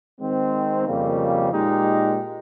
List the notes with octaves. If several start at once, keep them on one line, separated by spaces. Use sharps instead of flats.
D#3 G#3 C4
F2 C#3 G3 A#3
A#2 G#3 D#4 G4